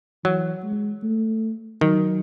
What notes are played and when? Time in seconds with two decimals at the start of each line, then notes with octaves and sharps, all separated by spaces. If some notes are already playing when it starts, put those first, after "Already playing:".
0.24 E3 F#3
0.63 G#3
1.03 A3
1.81 D#3 F#3